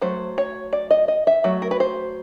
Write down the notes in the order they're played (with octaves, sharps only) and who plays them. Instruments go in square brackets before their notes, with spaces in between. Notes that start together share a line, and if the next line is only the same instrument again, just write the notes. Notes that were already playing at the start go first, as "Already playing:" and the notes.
[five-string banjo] F#3 A3 C5
C#5
D5
D#5
D#5
E5
F#3 A3
A#4
B4
C5